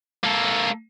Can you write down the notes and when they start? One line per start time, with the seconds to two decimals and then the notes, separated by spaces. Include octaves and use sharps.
0.24 A#3 A4